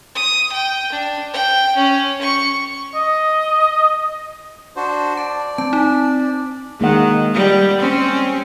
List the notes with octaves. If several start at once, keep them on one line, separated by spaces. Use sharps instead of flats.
D#6
G5
D4
G5
C#4
C#6
D#5
D4 F#4 C5
D5 A5
C4 A5
D#4
D#3 G#3 A#3 F#5
G3
C4 C#4